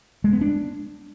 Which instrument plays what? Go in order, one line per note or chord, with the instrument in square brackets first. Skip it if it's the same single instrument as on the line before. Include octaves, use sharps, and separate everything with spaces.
[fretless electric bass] G#3
B3
D4